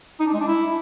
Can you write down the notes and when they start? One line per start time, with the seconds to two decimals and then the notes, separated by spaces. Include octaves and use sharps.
0.20 D#4
0.27 D4
0.33 G#3
0.40 D4
0.47 E4